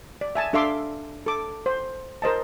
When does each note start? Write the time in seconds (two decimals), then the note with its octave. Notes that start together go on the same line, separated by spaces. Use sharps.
0.21 D5
0.35 E5 G#5 A5
0.53 D4 A4 E5 F5 C6 D6
1.26 A4 D6
1.66 C5
2.22 A#4 C5 D#5 A5